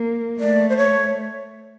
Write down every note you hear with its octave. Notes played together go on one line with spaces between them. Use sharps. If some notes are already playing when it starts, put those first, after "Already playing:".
Already playing: A#3
A3 D5
C5
C#5